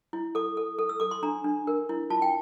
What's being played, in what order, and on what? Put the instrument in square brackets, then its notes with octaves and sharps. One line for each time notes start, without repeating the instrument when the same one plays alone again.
[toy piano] E4
A4 D6
A4
A4
E6
A4 D6
C6
D4 A#5
D4
A#4
E4
F4 A5
G5